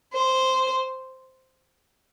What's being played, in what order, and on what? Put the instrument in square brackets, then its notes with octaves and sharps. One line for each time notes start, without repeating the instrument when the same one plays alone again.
[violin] C5